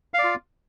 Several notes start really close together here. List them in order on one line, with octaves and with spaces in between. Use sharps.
F5 D5 F4